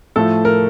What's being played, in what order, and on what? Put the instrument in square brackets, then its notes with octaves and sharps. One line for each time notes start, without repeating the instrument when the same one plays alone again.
[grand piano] A2 F3 A3 [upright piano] A4
[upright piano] A#4